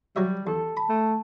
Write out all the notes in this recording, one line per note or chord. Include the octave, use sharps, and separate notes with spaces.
F#3 G3 G4 C#5 E5
E2 A4
A5 B5
A3